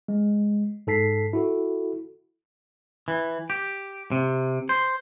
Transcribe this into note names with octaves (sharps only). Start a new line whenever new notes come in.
G#3
G#2 A4 A5 B6 C7
E4 F#4 A4
E3
G4
C3
C5